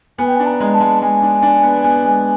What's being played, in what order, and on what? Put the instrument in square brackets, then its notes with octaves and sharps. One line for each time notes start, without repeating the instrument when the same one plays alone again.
[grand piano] B3 [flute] G#5
[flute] G5
[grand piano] D4 [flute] G#5
[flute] A#5
[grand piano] G#3
[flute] A5
[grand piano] G#3
[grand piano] G#3 [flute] G#5
[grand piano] D4
D4
B3
B3
G#3